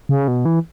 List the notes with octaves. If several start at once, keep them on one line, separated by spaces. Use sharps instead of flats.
C#3
B2
E3